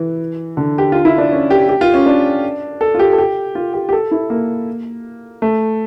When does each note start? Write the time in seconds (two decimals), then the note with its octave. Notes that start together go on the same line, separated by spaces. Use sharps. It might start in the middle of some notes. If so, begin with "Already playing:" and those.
Already playing: E3
0.57 D3
0.78 G4
0.92 F4
1.05 E4
1.18 D4
1.32 C#4
1.50 G4
1.69 G4
1.81 F4
1.94 C#4
2.06 D4
2.81 A4
2.94 F4
2.99 G4
3.13 A4
3.18 G4
3.55 F4
3.73 G4
3.89 G4
3.93 A4
4.11 E4
4.30 A#3
5.42 A3